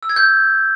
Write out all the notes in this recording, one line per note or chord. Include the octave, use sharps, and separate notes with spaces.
E6
G#6
G6